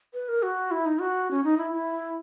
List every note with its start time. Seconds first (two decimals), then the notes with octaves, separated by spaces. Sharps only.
0.14 B4
0.28 A#4
0.43 F#4
0.71 E4
0.86 D#4
1.00 F#4
1.31 C#4
1.44 D#4
1.58 E4
1.72 E4